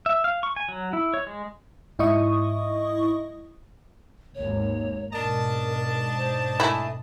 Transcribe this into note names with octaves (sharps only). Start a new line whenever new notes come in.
E5
F5
C#6
G#5
F#3
E4
C#5
G#3
G#2 E4 D#5 C#6 D#6
G#1 D#2 C#5
G#2 B2 D4 A#4 D#5 A5
C5
A3 E4 G#5